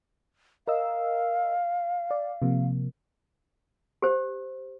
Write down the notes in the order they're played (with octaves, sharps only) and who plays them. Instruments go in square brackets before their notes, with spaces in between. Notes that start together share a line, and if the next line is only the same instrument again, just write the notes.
[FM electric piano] A#4 D#5 E6 [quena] F5
[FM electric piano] D5
C3 F3 A#3
[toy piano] G4 C5